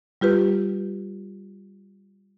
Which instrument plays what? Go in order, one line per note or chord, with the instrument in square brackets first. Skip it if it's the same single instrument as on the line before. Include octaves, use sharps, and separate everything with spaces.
[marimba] G3 F4 G4 B4